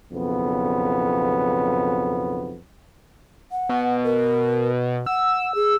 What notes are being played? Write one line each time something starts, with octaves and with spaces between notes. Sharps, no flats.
B1 F2 C#3 B3
F#5
B2
A#4
F#5 E6
G#4